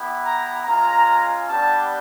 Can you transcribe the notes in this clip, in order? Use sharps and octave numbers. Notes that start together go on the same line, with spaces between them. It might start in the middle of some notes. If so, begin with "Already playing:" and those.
Already playing: B3 E4 G4
A#5
G#3 C#4 F4 A#5
G3 B3 D4 G4 A5